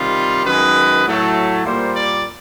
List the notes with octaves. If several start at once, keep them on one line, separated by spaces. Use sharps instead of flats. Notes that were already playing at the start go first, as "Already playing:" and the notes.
Already playing: C3 D#3 G3 F4
F#2 D#3 G#3 B4
A2 F#3 A3
A#2 G3 A#3 C5
D5